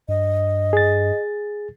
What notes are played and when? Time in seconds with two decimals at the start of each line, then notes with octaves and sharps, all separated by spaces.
0.09 G2 D#5
0.73 G#4 A6